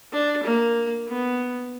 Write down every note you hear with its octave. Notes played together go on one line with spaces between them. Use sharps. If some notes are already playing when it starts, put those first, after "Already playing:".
D4
A#3
B3